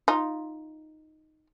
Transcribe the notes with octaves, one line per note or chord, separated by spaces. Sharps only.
D#4 F4